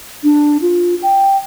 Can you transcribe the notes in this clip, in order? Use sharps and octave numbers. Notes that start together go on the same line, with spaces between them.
D4
F4
G5